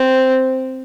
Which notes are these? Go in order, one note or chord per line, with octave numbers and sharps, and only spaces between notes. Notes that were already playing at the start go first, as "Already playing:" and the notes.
Already playing: C4